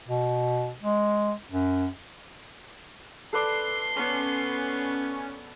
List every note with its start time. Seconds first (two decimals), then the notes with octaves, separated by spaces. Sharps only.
0.08 B2
0.83 G#3
1.52 F#2
3.33 A4 B4 D5 C6 C7
3.97 B3 C#4